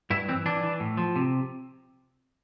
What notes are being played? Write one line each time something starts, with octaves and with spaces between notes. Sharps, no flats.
G2 E4
E3 C4
E3 D4
E3
A2
F3
C3